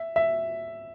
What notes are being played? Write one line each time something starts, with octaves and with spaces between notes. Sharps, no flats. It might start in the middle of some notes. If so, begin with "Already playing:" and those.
Already playing: E5
E5